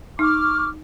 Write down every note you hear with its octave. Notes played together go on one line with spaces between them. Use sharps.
D#4 C#6 D6 F6